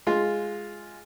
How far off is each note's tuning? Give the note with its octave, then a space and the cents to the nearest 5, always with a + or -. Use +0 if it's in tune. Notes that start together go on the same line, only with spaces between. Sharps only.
G#3 +0 F4 +0